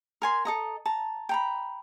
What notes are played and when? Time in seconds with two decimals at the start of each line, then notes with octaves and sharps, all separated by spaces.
0.22 A#4 G#5 C6
0.45 A4 D#5 A#5
0.86 A5 A#5
1.29 G5 A#5 B5